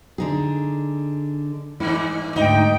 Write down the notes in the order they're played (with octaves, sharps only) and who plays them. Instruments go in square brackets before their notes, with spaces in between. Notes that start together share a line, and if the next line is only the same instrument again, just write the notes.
[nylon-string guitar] D3 D#4 G#4
[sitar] G2 E3 [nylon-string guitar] E4
[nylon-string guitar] D2 E5 [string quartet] G#2 G5 [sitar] D#4